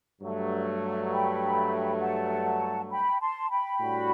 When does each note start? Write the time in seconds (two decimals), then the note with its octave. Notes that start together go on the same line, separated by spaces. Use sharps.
0.20 G2 F#3 A3
1.11 G5 B5
2.00 F#5 A5
2.90 G5 B5
3.21 A5 C6
3.50 G5 B5
3.80 A2 G3 D4 F#4